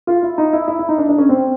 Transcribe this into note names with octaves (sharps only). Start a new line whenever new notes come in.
F4
E4
D#4
E4
E4
E4
D#4
D4
D4
C#4
C4